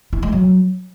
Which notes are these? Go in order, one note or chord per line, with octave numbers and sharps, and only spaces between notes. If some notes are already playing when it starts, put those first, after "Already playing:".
E4
G#3
F#3